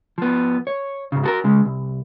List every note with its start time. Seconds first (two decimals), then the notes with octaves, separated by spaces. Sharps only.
0.18 F3 B3
0.67 C#5
1.12 G#2 C#3
1.24 F#4 A4 A#4
1.44 C#3 G#3
1.65 C2